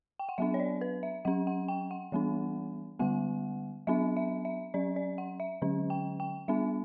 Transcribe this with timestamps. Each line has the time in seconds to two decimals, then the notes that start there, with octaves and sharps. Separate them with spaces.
0.19 G5
0.29 F#5
0.38 F#3 B3 D4 E5
0.54 C#5
0.60 D5
0.81 B4
1.03 E5
1.25 F#3 C#4 F#5
1.47 F#5
1.68 G5
1.91 F#5
2.12 E3 G3 B3 D4
2.99 D3 G3 B3 F#5
3.87 F#3 B3 D4 E5
4.17 E5
4.45 E5
4.74 F#3 C#4 D5
4.96 D5
5.18 F#5
5.40 E5
5.62 D3 F#3 C#4
5.90 G5
6.20 G5
6.48 G3 B3 D4 E5